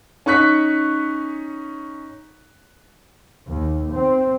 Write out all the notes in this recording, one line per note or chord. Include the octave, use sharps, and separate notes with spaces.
C#4 D#4 C#6 F#6 B6
D#2
C4